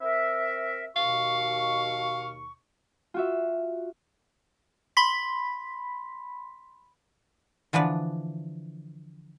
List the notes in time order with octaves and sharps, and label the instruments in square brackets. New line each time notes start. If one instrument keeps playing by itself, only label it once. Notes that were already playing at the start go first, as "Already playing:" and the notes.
[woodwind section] C4 A#4 E5
[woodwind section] D#2 B2 C#6 [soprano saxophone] F5
[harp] F4 F#4 E5
[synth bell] B5 C6 B6
[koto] D3 E3 F3 D4 B4